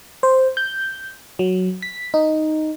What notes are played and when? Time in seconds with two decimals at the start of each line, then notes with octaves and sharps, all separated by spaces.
0.23 C5
0.57 G6
1.39 F#3
1.82 B6
2.14 D#4